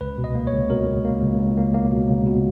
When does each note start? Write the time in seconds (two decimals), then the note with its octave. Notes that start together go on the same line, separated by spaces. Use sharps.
0.01 C#2 B4
0.18 B2
0.24 D#5
0.35 A#3
0.47 C#5
0.53 C#2
0.70 B2 A#4
0.87 C#2
1.05 A#3
1.22 C#2
1.39 C#2
1.57 A#3
1.74 A#3
1.91 B2
2.08 C#2
2.26 B2